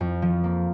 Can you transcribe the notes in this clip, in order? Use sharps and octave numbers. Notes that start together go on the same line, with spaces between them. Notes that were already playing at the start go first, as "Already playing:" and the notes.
F2
F3
A#3